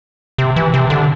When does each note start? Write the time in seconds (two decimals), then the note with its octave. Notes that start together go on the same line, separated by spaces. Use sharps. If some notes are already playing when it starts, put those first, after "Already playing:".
0.38 C3
0.56 E3
0.74 C3
0.90 D3